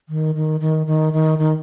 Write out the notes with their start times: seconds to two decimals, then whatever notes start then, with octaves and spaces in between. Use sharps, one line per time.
0.09 D#3
0.35 D#3
0.60 D#3
0.87 D#3
1.13 D#3
1.39 D#3